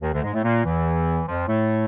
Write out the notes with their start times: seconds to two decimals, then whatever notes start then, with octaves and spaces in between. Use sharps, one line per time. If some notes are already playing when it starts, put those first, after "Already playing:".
0.02 D#2 D#3
0.13 D2 D3
0.23 G#2 G#3
0.34 A2 A3
0.43 A#2 A#3
0.64 E2 E3
1.27 F2 F3
1.47 A2 A3